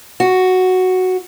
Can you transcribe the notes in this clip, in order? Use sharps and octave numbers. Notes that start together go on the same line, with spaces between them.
F#4